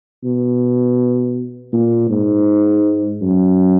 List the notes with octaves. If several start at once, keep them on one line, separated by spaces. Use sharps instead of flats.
B2
A#2
G#2
F#2